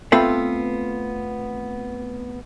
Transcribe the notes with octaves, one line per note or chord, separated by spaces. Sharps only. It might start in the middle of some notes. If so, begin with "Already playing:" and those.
A3 B3 C4 F4 A4 B4